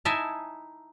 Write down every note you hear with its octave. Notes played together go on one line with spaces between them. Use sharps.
D#4 E4 E5 G#5 A5